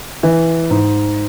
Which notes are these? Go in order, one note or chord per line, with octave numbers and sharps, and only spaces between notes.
E3
G#2